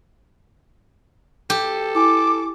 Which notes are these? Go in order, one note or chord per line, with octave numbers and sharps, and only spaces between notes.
G4 A4
E4 G#5 D6